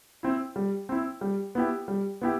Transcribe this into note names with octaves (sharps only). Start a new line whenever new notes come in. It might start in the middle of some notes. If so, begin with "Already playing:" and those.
C4 E4
G3
C4 E4
G3
B3 E4 G4
G3
B3 E4 G4